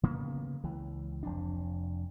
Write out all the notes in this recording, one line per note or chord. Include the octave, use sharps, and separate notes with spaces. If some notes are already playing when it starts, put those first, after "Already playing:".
C#3 A#3 B3
C#2 E3
F1 F2 D4